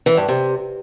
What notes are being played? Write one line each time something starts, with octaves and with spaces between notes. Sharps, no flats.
E3
G2
C3